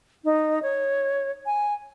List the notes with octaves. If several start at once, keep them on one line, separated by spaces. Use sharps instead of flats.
D#4
C#5
G#5